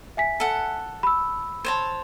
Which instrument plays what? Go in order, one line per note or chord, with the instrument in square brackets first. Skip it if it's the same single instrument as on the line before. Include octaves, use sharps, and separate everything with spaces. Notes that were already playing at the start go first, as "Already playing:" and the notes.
[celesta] E5 G#5 B6
[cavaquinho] A4 F#5
[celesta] B5 E6
[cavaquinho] C5 C#5 A5